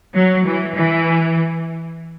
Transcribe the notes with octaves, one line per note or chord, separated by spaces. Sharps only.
F#3
E3
E3